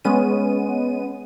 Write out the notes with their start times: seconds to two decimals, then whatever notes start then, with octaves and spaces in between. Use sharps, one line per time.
0.05 G#3 B3 C#4 D#7